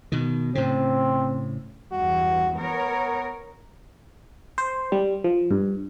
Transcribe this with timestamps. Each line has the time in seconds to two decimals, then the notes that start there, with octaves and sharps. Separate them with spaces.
0.12 B2 D#3
0.55 A2 C#3 C4
1.92 E2 G2 F#4
2.56 B3 A#4 C#5
4.58 C5
4.92 G3
5.24 F3
5.51 G2